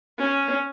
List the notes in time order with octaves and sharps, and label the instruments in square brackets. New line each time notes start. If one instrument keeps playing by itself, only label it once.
[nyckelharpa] C#4